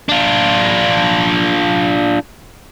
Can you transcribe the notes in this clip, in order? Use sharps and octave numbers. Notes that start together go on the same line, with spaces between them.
D4 F4